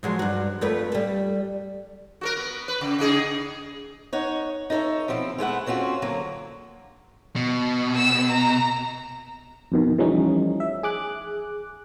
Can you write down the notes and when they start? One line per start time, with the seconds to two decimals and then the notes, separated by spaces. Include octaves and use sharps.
0.03 F3 F#3 G#3
0.19 G2 F#4
0.61 F2 A3 B4
0.92 G3 A4
2.21 F#4 A4 A#4
2.37 B3
2.68 B4
2.81 C#3
2.99 C#3 D#4 G#4
4.13 D#4 C#5 F#5
4.70 D#4 A4 A#4 C#5 E5
5.08 B2 F3 C4 E4
5.38 G#3 A3 E4 F#5
5.66 A3 C4 C#4 F4 F#4
6.02 D3 F#3 A#3
7.36 B2
7.97 E6 E7
8.32 A#5
9.72 F2 B2 D#3
9.98 E3 F3 G3 A3 C#4 D#4
10.60 E5
10.83 G#4 D6 F#6